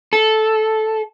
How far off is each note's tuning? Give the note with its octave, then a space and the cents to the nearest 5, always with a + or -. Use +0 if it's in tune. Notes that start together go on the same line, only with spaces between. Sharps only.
A4 -10